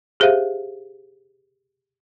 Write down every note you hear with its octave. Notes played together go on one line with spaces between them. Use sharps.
G4 G#4 C5 E5 F5